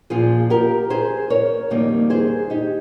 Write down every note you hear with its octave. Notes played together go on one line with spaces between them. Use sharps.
A#2 F3 A#3 F4 G#4
G4 A#4
G#4 C5
A#4 C#5
F2 D#3 G3 A#3
G#4 C5
D#4 G4